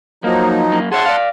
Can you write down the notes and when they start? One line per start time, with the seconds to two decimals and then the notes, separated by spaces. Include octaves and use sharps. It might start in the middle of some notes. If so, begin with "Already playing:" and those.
0.24 F3 F#3 A#3 D#4
0.72 F#2 A#3
0.92 G#4 C#5 E5 F#5 A5 C6
1.05 D5 F5